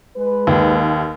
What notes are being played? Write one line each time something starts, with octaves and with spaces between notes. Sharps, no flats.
G#3 B4
D#2